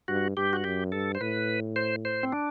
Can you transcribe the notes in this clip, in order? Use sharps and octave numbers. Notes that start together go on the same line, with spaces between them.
G2 F#4
G2 G4
F#4
F#2 G4
G2 A4
C5
A2 B4
C5
C5
C4
D4